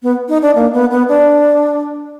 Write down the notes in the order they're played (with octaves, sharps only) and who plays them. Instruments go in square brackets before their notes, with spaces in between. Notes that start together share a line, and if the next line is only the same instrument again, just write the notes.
[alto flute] B3
D#4
D4
A#3
B3
B3
D4